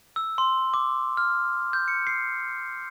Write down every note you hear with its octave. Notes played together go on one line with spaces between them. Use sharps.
E6
C6
D6
F6
G6
C#7
C7